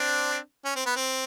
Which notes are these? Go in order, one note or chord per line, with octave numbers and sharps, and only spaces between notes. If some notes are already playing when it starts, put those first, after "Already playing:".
Already playing: C4 D4
C#4
C4
B3
C4